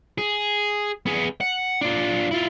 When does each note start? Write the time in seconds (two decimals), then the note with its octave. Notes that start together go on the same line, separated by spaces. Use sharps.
0.18 G#4
1.06 B3 G#4
1.41 F#5
1.81 D4 F4
2.31 E4 F4